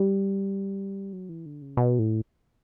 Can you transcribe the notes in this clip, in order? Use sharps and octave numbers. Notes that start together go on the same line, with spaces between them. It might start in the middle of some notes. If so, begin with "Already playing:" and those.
Already playing: G3
F#3
E3
D3
C#3
B2
A2